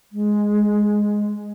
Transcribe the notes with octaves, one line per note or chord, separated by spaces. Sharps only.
G#3